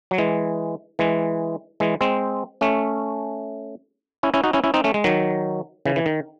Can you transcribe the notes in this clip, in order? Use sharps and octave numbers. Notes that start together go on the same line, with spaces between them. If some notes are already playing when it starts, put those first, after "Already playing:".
F#3
E3 G#3
E3 G#3
E3 G#3
G#3 C4
A3 C#4
C#4 E4
C#4 E4
D#4 F#4
C#4 E4
C#4 E4
C4 D#4
A3 C#4
G#3
D#3 F#3
C#3 E3
E3
D#3